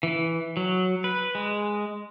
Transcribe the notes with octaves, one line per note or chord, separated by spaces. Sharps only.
E3
F#3
B4
G#3